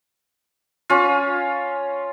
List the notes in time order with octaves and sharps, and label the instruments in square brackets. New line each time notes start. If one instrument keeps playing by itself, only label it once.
[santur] C#4 F4